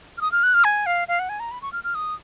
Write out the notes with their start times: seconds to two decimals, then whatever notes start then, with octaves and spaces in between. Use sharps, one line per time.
0.18 F6
0.21 D#6
0.32 F6
0.43 F#6
0.54 F6
0.64 G#5
0.86 F5
1.08 F5
1.19 F#5
1.29 G#5
1.40 A#5
1.51 B5
1.62 C#6
1.73 F6
1.84 F6
1.95 D#6